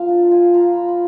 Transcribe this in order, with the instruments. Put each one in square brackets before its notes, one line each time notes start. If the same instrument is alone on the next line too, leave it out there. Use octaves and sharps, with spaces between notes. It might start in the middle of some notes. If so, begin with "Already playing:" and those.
Already playing: [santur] F3 A#3 F4 F5
D4
F4 G#5
F4 A#5
F4 B5
B5